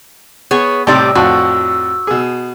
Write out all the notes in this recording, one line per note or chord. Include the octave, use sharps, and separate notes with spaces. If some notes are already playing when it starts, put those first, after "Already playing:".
B3 G#4 C#5
A2 C3 G3 C4 D5 E6
F2 A2 F#4
B2 G#4